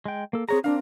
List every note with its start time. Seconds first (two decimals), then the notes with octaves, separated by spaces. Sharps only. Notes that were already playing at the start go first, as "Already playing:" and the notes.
0.06 G#3 G5
0.33 A#3 A4
0.49 C4 G#4 C#5 A#5
0.64 C4 D4 A#4 F5